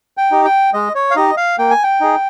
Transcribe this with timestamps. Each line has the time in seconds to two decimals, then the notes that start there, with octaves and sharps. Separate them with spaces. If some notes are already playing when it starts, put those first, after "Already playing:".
0.17 G5
0.31 D#4 G4
0.45 G5
0.74 G#3 D#5
0.95 C#5
1.11 F5
1.16 D#4 G4 D#5
1.37 F5
1.58 A#3 G5
1.71 G#5
1.83 G5
2.01 D#4 G#4